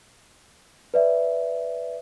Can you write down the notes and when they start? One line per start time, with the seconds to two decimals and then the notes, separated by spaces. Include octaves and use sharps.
0.94 B4 D5 E5